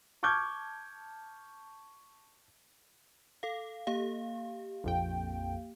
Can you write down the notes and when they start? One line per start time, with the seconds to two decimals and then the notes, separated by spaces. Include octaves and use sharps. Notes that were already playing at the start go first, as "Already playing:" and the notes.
0.23 A5 C#6 D6 F6 G6 G#6
3.43 A4 F5
3.87 A#3 G4 F5
4.84 A#1 F2 G5